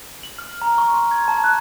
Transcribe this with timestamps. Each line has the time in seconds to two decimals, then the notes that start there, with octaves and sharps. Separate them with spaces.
0.23 F#7
0.38 F6
0.62 A#5
0.78 C#6
0.93 C6
1.11 G#6
1.28 A5
1.44 F#6